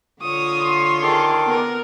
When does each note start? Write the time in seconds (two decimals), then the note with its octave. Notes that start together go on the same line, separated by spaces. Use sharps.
0.22 D3 F4 C#5 D#6
0.63 C6
1.03 D#3 G#4 A4 D6
1.46 B3 A#4